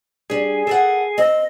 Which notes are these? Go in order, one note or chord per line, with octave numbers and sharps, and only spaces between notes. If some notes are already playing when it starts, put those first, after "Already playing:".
G3 D4 G#4
A4 A#4 F#5
C4 D#5